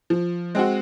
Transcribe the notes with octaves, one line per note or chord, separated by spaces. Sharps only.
F3
G#3 C4 F#4